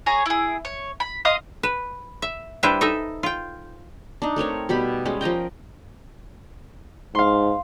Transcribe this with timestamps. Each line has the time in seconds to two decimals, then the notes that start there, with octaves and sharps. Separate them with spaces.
0.06 G#4 C#5 G#5 A#5
0.26 E4 G#4
0.65 C#5
1.00 B5
1.25 D#5 F5 C6 D#6
1.63 B4
2.22 E5
2.63 G3 D4 E4 B4 C5 E5
2.81 D#4 A4 D#5 E5
3.23 F4 G5
4.22 D4 D#4
4.36 A3 C4 A#4 C#5
4.69 B2 G3 G4 B5
5.05 G3 G#3 C#4
5.21 F3 A#4 D#5 G5
7.15 G#2 F5 C6